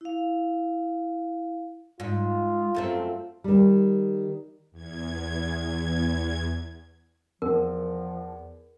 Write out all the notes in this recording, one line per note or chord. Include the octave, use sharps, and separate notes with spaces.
E4 F5
G#2 F4
F#2 A3 C4
D#3 G3
E2 G#6
E2 F3 A#4